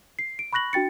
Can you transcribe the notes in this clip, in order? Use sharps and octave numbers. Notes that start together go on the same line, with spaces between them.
C7
D7
B5 C#6 F#6 A#6 F#7
D4 F#4 G5 A6 C#7